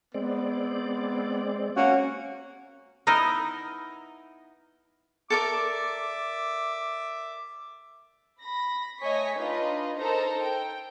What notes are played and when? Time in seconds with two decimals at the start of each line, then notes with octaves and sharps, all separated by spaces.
0.14 G#3 B3 C4 D5
1.76 A#3 C#4 F#4
3.07 B3 D#4 E4 A#4 D#5
5.30 A4 A#4 D5 E5 D6
8.41 B5 A#6
9.00 A3 C#5 D#5 G#5 C#6 B6
9.38 D4 D#4 F4 B4 D#5
9.98 D#4 A4 A#4 C5 A#5
10.41 G5